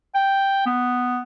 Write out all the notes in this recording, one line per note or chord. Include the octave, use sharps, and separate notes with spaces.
G5
B3